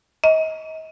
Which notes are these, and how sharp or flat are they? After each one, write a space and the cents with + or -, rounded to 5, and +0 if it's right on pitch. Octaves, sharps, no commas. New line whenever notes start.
D#5 +35